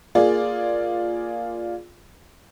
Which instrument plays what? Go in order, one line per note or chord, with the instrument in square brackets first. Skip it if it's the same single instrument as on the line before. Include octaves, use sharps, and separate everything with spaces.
[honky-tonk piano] A#3 F4 G#4 D5